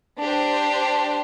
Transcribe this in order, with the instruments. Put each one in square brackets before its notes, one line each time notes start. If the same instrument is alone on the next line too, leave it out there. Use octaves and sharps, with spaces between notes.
[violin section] D4 G4 C5